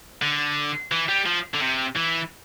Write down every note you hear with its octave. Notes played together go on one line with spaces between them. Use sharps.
D3
E3
G3
F3
D3
C3
E3